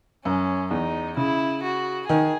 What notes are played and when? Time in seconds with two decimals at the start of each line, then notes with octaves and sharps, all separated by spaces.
0.24 F#2 C#4
0.71 E2 D#4
1.16 C#3 E4
1.62 F#4
2.09 D#3 G#4